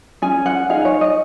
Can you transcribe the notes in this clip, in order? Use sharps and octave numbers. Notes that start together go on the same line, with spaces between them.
C#4 G#4 G#5
F#5
D#4 G#4 F5
C#5
D#5